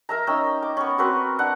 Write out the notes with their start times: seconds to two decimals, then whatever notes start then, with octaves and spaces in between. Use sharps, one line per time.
0.09 A#4 E5 A#5
0.27 C#4 D#4 G5 E6
0.63 D6
0.77 B3 C#4
0.98 C4 F#4 A#4 B4
1.39 D4 F#5